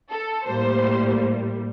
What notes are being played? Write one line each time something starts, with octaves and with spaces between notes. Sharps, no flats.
A4
A2 G3 A#3 C5